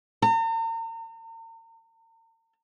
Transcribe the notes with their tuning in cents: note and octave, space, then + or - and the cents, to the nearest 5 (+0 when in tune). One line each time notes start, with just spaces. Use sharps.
A#5 -45